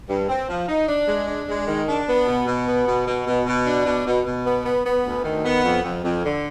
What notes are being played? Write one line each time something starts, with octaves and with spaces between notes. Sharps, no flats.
G2
C4
F3
D#4
D4
G#3
D4
G#3
D#3
D4
B3
B2
B2
B3
B2
B2
B2
B2
D4
B2
B2
B2
B3
B3
B3
D2
D#3
B3
F2
F2
F2
D3